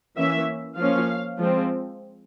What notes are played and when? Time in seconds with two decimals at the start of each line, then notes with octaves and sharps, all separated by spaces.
0.17 E3 A#3 C#4 E5
0.78 F3 A#3 C#4 F5
1.39 F3 G#3 C4